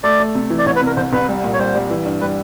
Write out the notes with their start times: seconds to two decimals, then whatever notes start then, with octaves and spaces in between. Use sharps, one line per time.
0.04 A3 D5
0.20 A3
0.35 C3
0.50 E3
0.59 D5
0.66 C2 C#5
0.76 B4
0.82 C3
0.87 A#4
0.96 C2 C5
1.13 C2 B4
1.29 G3
1.44 A#2
1.53 C#5
1.59 G3 C5
1.75 G3
1.91 E3
2.05 G2
2.21 G3 B4